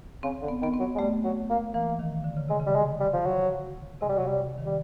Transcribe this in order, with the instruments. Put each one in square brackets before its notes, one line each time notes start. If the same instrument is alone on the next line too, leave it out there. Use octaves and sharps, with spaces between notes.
[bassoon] C#3 [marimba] C4
[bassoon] D3
[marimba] B3
[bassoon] D#3 [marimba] B3
[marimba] C4
[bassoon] F#3
G#3
[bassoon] G3 [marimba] A3
[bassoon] F#3
A#3
[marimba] E3 [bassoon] A#3
[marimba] D#3
D3
C#3
[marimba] C3 [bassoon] G#3
[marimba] C#3
[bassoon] G3
G#3
G3
F3
F#3
[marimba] C3 [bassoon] G#3
[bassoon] G3
[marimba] C3 [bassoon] F#3
[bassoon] G3
[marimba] D#3
[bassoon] G3